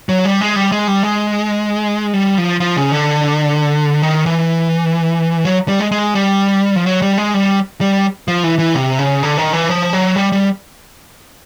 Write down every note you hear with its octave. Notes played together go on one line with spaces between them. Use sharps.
F#3
G3
G#3
G3
G#3
G3
G#3
G3
F3
F3
C#3
D3
D#3
E3
F#3
G3
G#3
G#3
G3
F3
F#3
G3
G#3
G3
G3
F3
E3
E3
C3
C#3
D3
D#3
E3
F3
F#3
G3
G3